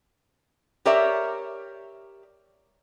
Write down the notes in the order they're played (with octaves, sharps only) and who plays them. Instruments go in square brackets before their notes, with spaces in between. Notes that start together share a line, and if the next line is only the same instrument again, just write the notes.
[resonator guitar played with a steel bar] G4 A#4 C#5 D5 E5